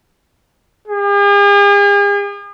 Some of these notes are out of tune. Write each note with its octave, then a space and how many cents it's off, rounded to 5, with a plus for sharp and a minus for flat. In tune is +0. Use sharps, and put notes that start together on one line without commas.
G#4 -45